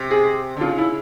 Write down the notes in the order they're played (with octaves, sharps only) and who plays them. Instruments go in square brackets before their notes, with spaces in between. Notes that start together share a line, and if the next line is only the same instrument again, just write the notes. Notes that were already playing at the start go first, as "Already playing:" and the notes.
Already playing: [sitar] C3
[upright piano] G#4
[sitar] D3
[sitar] C#3 [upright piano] F4
[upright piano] E4